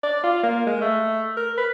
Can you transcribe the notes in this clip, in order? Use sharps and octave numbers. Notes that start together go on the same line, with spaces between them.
D5
F4
A#3
G#3
A3
A#4
B4